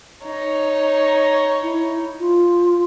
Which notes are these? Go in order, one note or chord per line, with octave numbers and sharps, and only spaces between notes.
D#4 C#5
E4
F4